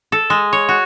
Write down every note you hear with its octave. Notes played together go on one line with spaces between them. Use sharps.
A4
G#3
C#5
F#4